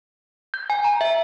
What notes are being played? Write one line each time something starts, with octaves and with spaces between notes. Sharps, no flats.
G6
G#5
A#5
E5